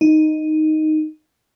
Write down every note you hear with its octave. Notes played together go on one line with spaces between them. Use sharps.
D#4